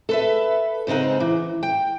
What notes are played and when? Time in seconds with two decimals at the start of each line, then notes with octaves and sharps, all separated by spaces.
0.09 A4 B4 E5
0.87 G#2 C#3 C4 D#4 F#5
1.20 E3
1.63 G5